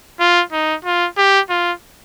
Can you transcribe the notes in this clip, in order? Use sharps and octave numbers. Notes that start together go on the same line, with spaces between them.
F4
D#4
F4
G4
F4